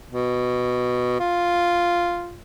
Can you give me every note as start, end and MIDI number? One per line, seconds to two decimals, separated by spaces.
0.12 1.19 47
1.20 2.39 65